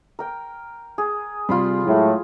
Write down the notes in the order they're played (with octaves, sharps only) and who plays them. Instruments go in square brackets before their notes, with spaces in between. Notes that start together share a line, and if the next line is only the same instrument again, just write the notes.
[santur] A#4 G5
G#4
[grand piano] C3 G3 [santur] F4 B5 C6
[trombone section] A2 [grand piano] F#3 G#3